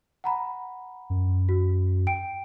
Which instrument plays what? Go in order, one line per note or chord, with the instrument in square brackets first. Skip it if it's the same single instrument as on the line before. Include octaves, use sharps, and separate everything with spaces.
[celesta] F#5 A#5 B5
[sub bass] F#2
[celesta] F#4
G5 D7